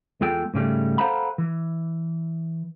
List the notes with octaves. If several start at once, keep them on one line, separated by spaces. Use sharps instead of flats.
E2 G#3 F4 A4 G5
G#2 C#3 G3 A3
A4 C5 F5 F#5 A#5 B5
E3